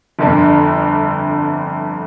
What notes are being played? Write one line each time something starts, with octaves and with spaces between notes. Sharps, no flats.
G1 F2 D3